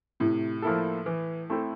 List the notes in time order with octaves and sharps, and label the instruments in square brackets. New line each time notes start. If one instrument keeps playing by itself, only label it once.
[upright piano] A2 [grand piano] C3
[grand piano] F3 A#3 E4 A4
E3
A3 C4 E4 A4